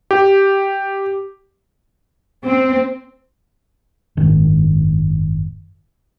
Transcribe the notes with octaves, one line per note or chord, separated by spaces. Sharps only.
G4
C4
F#1 G#2 D#3